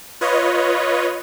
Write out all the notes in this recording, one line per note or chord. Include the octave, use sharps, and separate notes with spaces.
F4 B4 C#5 D#5